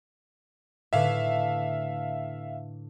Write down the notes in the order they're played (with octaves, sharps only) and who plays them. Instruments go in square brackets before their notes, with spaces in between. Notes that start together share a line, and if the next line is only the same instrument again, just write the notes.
[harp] A2 D3 B4 [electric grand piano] E5 F5